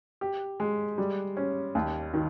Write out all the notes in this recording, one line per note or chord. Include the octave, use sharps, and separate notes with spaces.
G4
G#3
G3
C#4
D#2
D#3